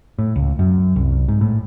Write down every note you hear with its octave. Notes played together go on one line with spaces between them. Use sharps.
A2
C#2
F#2
C2
G#2
A2